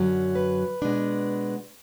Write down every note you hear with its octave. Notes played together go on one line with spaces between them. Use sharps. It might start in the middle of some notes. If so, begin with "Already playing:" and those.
Already playing: F#2 D3 F#3
B4
B2 G#3 B3 D4